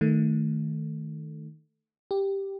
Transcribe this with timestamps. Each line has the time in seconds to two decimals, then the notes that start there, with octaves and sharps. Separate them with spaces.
0.01 D#3 A3
2.11 G4